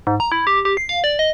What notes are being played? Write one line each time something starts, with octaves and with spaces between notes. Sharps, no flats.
G#2
A#5
E4
G4
G4
C7
F5
D5
D#5